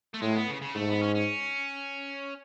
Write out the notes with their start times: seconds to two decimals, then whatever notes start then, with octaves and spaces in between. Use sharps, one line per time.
0.14 A3
0.22 A2 G#3
0.35 B3
0.48 C#3
0.62 C#3
0.75 G#2 A3
0.89 B3
1.03 C#4
1.15 C#4